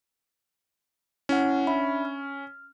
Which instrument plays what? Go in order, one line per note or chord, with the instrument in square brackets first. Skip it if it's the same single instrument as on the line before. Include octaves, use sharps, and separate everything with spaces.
[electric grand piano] C#4 [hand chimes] E4 F#5
[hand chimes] D4 E5 B5
F6